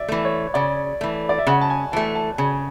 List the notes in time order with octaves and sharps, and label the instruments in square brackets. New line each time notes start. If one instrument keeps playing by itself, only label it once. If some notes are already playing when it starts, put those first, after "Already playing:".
Already playing: [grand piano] D5 E5
[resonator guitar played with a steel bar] E3 A3
[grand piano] C#5
[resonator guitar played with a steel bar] C#3 [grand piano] D5
[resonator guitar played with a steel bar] E3 A3
[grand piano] D5
E5
[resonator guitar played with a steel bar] C#3 [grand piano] F#5
[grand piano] A5
G#5
[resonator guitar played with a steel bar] E3 A3 [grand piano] A5
[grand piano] A5
[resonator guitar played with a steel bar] C#3 [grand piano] G#5